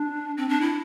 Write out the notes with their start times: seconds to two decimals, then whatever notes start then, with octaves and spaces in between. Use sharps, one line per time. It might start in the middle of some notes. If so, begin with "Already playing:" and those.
Already playing: D4
0.37 C4
0.49 D4
0.61 E4